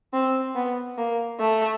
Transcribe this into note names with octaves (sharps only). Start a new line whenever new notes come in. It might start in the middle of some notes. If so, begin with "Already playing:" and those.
C4
B3
A#3
A3